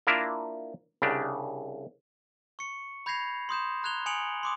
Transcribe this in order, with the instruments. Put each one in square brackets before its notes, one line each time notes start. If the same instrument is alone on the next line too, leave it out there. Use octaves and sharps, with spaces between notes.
[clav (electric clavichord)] A#3 D4 E4 F4 A#4 E5
C2 C#3 D4 G4
[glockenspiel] C#6 C#7
B5 G6 G#6 A#6 C7 F7
C6 D#6 G6 E7
A#5 F#6 G#6 F7 G7
G#5 D#6 C#7 D7 F7 F#7
C6 D6 D#6